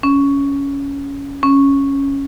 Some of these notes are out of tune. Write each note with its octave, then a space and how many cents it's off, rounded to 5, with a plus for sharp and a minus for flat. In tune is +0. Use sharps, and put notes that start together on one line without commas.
C#4 +10
C#4 -5